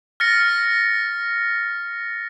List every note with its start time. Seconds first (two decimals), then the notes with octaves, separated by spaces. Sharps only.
0.20 F6 A6 A#6 C#7